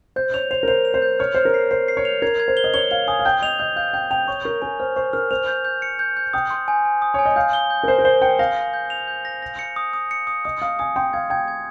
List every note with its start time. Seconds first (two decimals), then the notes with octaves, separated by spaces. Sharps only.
0.16 C5 G6
0.34 C#5 F7
0.51 C5 F7
0.63 A#4
0.68 C5 F7
0.85 F7
0.94 C5
1.02 G6
1.19 C#5 F6
1.35 C5 F6
1.45 A#4
1.54 C7
1.71 C5 C7
1.88 C7
1.97 C#5
2.05 F7
2.22 A#4 G#6
2.40 G#6
2.48 C5
2.57 G7
2.64 D#5
2.74 C#5 G7
2.91 F5 G7
3.08 G#5 D#6
3.19 F5
3.25 G5 G6
3.42 D#5 F7
3.59 D#5 G6
3.76 F5 G6
3.94 G5 G6
4.11 G5 F7
4.28 C#5 C#6
4.45 A#4 C#6
4.62 A#4 G#5
4.79 C5 F6
4.96 C5 C#6
5.13 A#4 F6
5.31 C5 F7
5.47 G6
5.65 G6
5.82 C#7
5.99 G6
6.17 G6
6.33 G5 D#6
6.50 C6
6.68 G#5
6.85 G#5
7.02 D#6
7.14 C#5 G#5
7.26 D#5
7.36 F5 G6
7.53 G7
7.70 G6
7.83 A#4
7.88 C5 G6
7.98 A#4
8.05 C5 G7
8.22 G5 C#7
8.39 F5 A#6
8.57 A#6
8.74 G6
8.90 F7
9.08 G6
9.25 A#6
9.42 A#6
9.59 C#7
9.76 D#6
9.93 D#6
10.11 C#7
10.27 D#6
10.45 D#5 D#6
10.62 F5 D#6
10.79 G#5 D#6
10.96 G5 C6
11.13 F5 G#6
11.30 G5 G#6
11.48 G#6